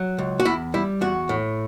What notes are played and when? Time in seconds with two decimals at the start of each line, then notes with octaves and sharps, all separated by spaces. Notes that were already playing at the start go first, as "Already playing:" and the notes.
Already playing: F#3
0.18 C#2
0.40 F#4
0.45 E2 E4
0.74 G3 E4
1.01 E2 F#4
1.29 A2